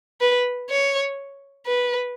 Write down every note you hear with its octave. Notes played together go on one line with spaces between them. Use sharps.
B4
C#5
B4